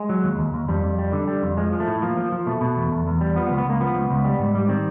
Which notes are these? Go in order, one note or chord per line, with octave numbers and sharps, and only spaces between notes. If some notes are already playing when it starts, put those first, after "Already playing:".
Already playing: G#3
F#3
D#2
D#2
D#2
F2 G3
F2
G3
D3
G3
F2
F3 G#3
F3
A3
A2
F3 A#3
F3
F3
B2 A3
B2
E2
E2
E2
G3
F3 B3
B3
C#2
B3
C#2 A#3
F3 B3
C#2
C#2
G3
G#2
G3
D#3 C4